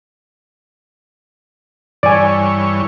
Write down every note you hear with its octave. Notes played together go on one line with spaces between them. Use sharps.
G2 E3 C#5 D5 G#5